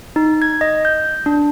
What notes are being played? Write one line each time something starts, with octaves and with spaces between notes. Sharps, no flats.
D#4
G#6
D#5
G6
D4